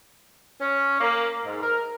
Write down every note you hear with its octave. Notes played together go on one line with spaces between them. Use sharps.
C#4
A#3
G#2
A#4